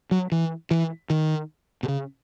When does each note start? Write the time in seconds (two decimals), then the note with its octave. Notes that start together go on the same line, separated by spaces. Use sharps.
0.11 F#3
0.32 E3
0.71 E3
1.10 D#3
1.83 B2
1.88 C#3